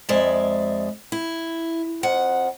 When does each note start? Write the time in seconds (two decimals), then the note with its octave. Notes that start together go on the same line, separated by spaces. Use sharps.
0.09 F2 G#3 D5 E5
1.12 E4
2.03 F2 F#5